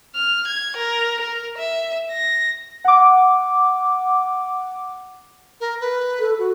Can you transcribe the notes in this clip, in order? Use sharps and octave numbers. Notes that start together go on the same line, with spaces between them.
F6
G#6
A#4
A#4
E5
A#6
F#5 D6
A#4
B4
A4
F#4